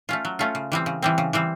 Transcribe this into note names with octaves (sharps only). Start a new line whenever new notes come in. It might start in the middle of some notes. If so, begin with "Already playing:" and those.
A3 C#4 F4
F#3
A3 C#4 F4
C#3
E3 G3 C4
C#3
E3 G3 C4
C#3
E3 G3 C4